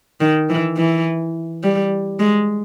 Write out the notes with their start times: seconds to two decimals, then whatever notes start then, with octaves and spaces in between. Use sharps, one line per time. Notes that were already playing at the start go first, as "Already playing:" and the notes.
0.21 D#3
0.49 E3
0.77 E3
1.63 G3
2.19 G#3